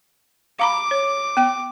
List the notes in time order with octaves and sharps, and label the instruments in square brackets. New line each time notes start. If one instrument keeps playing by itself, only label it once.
[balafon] F5 A#5 B5 [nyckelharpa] D6
[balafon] C#5
B3 G5